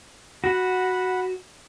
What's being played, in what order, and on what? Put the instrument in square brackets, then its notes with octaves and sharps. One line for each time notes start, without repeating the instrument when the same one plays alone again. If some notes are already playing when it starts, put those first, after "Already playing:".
[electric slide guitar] F#4 [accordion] F#5 B5